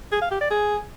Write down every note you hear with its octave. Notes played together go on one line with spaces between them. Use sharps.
G#4
F5
G4
D5
G#4